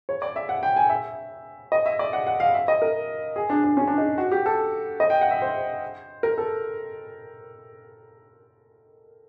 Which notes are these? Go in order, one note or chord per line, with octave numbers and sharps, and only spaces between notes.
C#5
D5
E5
F#5
G5
G#5
E5
D#5
E5
D5
F#5
F#5
F5
E5
D#5
A#4
G#4
D4
D4
C#4
D4
D#4
F#4
G4
A4
D#5
G5
F#5
E5
C5
A#4
A4